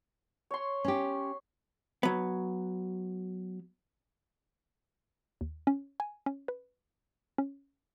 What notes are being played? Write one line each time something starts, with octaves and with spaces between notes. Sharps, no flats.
C#5 C6
C#4 G4
F#3 B3
D#2
C#4
G#5
C#4
B4
C#4